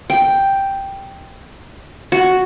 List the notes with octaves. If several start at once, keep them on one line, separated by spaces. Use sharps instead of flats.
G5
F#4